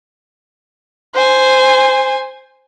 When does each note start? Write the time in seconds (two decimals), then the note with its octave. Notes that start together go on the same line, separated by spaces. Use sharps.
1.14 C5 G#5